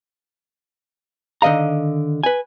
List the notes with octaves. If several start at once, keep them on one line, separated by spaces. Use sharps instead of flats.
D3 D#3 D#5 F5 A#5
B4 G#5